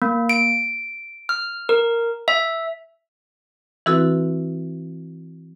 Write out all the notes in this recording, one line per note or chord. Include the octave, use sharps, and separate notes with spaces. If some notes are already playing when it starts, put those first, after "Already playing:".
A#3
D7
F6
A#4
E5
E3 C4 E4 F#4 A4 B4